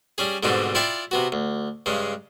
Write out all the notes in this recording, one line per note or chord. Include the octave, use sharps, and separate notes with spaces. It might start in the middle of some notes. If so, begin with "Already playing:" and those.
G3 C#4 G#4
G#2 B2 D3 G3 C4 D#4
E4 F4 D5 E5 F5 G5
C3 B3 F#4
D2
G2 C#3 G#3